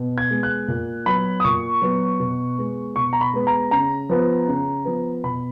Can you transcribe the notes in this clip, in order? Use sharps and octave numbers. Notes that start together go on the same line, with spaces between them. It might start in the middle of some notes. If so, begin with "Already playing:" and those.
Already playing: B2
G#6
G#3 B3
F#6
A#2
F#3 B3 B5
D#6
A#2 C#6
F#3 B3
B2
G#3 B3
B2 C#6
A#5
B5
G#3 B3
A#5
C#3 A#5
F3 B3
C#3
F3 B3
B2 B5